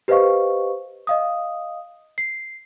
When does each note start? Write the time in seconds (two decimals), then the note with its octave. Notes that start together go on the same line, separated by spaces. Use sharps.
0.08 G4 B4 C5 D#5 F5 C#6
1.07 D#5 F5 D#6
2.18 C7